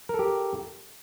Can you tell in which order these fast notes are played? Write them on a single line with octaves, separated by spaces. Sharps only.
A#4 A4 G4